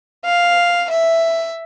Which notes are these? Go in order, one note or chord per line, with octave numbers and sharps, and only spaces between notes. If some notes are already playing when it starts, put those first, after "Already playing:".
F5
E5